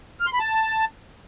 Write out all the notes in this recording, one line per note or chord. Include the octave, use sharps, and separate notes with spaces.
F6
C6
B5
A5